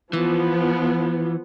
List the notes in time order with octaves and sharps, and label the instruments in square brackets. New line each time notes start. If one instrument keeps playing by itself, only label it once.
[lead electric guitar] E3 [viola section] F3 B3